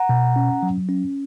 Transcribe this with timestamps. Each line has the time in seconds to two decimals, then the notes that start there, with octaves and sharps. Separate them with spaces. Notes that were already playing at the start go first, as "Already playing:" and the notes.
Already playing: F#5 A#5
0.09 B2
0.36 C#4
0.63 F#3
0.89 C#4